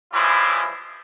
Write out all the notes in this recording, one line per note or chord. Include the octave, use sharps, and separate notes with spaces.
E3 F3 G3 G#3 C#4 E4